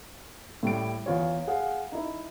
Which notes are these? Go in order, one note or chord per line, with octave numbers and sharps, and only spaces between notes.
A2 G3 D7
E2 F4 C#5
G#4 F5 F#5
D#4 E4